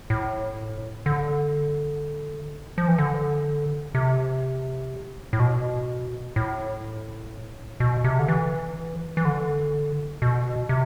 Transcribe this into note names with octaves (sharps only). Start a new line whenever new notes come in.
A2
D3
F3
E3
D3
C3
A2
B2
A2
B2
C3
D3
E3
E3
D3
B2
C3